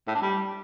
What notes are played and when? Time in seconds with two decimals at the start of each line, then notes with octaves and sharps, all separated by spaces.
0.07 A2
0.15 D4
0.22 G3